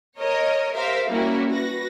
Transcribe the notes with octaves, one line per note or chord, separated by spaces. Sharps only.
A#4 C#5 D#5
G4 A#4 C5 E5 F5
G3 A#3 C#4 E4 F#4 A#4
F#4 B4 A#6